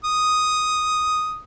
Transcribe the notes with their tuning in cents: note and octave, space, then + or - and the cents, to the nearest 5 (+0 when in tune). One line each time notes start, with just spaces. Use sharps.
D#6 +0